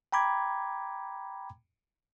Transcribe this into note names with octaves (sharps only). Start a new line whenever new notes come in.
G5 A#5 B5 D6 G#6